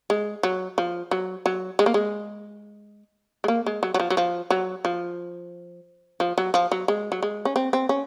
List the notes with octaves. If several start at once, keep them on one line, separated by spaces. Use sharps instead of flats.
G#3
F#3
F3
F#3
F#3
G#3
A#3
G#3
G#3
A#3
G#3
F#3
F#3
F3
F#3
F3
F#3
F3
F3
F#3
F3
F#3
G#3
F#3
G#3
C#4
C4
C4
C#4